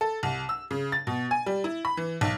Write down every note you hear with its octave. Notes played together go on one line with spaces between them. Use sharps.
A4
C2
E6
C#3
A6
B2
G#5
G3
E4
B5
E3
B1